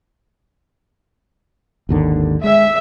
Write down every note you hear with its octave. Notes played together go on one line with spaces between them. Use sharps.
G#1 D#2 D3
G#3 E5